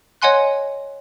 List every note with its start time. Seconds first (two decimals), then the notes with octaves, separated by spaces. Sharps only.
0.22 C#5 D#5 F#5 G#5 C6 F#6